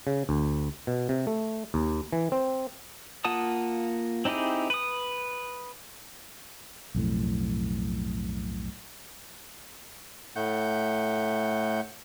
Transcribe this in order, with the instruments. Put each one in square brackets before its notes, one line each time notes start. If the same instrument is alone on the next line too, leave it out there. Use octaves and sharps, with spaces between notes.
[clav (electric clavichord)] C#3
D2
B2
C3
A3
D#2
E3
C4
[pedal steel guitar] A#3 F4 F#5 A5 D#6
C4 D#4 E4 G4 G#4
B4 D#6
[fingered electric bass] B1 F2 A2
[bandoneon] A2 A3 F#5 G6